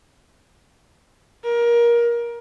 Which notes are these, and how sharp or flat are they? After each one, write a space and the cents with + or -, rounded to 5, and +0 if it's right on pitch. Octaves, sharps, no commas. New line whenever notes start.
A#4 +20